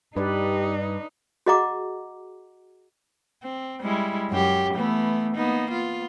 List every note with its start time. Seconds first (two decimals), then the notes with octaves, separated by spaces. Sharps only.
0.16 G2 D4 D#4 G4 B4 D5
1.46 F#4 G#4 D#5 F#5 A#5 D6
3.43 C4
3.81 G3 G#3 E4
4.30 F#2 G4
4.74 E3 A3 B3
5.36 A#3 B3 D#4
5.71 B3 F4